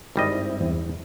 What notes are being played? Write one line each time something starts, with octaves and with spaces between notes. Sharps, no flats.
G#1 G2 G3 C4 E4 D#5
E2